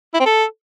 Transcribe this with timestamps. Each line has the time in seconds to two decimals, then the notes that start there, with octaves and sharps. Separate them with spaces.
0.14 E4
0.20 C4
0.26 A4